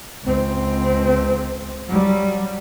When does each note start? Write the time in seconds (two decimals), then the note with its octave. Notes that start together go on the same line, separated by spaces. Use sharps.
0.23 C#2 C4
1.88 F#3 G3